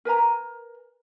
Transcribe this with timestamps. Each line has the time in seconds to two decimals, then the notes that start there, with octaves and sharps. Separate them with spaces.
0.05 A#4 B4 G#5 A#5